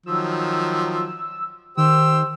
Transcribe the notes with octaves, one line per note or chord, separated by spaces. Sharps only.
D#3 F3 F#3 E6
D#3 G4 C5 E6